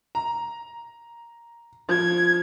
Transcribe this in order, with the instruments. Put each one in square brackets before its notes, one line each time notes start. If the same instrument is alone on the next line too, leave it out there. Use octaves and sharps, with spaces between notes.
[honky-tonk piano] A#5
[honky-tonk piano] F3 [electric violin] G#6